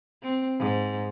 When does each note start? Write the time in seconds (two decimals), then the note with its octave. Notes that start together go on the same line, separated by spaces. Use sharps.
0.23 C4
0.59 G#2